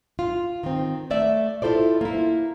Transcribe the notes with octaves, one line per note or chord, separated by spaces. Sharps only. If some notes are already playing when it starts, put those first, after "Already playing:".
F4
D#3 C4
A3 D5 E5
E4 F4 A4 C5 D5
A#3 E4